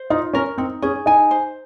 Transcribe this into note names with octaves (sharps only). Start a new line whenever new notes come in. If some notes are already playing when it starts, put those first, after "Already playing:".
Already playing: C5
D#4 F4
C#4 A#4
C4 D#4
C#4 G#4
D#4 G#5
C5